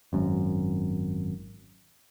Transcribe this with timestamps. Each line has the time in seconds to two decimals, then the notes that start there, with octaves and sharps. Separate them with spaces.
0.13 G#1 F#2